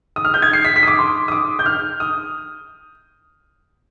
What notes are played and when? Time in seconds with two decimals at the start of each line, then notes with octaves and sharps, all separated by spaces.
0.16 D#6
0.25 F6
0.34 G6
0.42 G#6
0.53 C7
0.65 B6
0.76 B6
0.83 D#6
0.88 D6
0.99 C6
1.28 D#6
1.32 D6
1.59 G6
1.66 F6
2.00 D#6